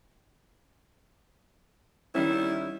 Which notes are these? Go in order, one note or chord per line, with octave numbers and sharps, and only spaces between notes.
D#3 G3 C#4 E4